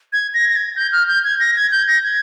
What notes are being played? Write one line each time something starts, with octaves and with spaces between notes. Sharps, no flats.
G#6
A#6
A#6
G#6
G6
F6
G6
G#6
A#6
G#6
G6
A#6
G#6